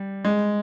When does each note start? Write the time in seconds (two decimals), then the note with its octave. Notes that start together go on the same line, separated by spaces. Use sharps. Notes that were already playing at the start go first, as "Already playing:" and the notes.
Already playing: G3
0.25 G#3